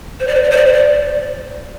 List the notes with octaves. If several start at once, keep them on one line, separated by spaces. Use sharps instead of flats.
C5
D5
C5
D5
C5
D5
C5
D5